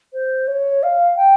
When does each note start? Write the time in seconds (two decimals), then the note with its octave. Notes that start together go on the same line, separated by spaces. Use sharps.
0.13 C5
0.47 C#5
0.83 F5
1.17 G5